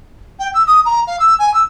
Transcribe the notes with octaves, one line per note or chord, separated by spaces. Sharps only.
G5
E6
D#6
A#5
F5
E6
G#5
E6